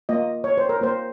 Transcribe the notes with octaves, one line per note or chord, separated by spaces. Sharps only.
A#3 F4 D#5
C#5
C5
A#4
A#3 F4 C5